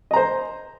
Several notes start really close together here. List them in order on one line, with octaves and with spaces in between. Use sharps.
D#5 A#5 C5